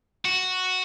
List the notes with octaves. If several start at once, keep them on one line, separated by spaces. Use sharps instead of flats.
F#4